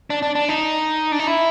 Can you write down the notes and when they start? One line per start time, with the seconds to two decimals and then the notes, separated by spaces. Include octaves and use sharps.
0.10 D4
0.23 D4
0.35 D4
0.49 D#4
1.12 D4
1.19 D#4
1.27 E4